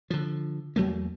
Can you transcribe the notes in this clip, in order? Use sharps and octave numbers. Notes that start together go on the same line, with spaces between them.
D3 F3
E2 F#3 A3 A#3